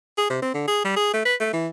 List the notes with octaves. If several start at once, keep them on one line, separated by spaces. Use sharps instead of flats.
G#4
C3
C4
D3
G#4
G3
G#4
A3
B4
A3
E3